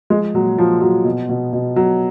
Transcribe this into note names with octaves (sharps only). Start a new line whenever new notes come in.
F3 G#3
A#2 F#3
A#2 F3
F3 F#3
B2
B2
B2
B2 F#3